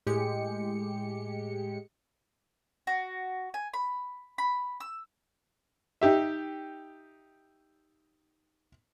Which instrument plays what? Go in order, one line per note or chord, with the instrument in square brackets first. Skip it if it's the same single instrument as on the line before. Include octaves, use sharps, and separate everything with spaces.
[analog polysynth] A2 G#3 G4 C#7
[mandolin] F#4
G#5
B5
B5
E6
[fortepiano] D#4 G4 E5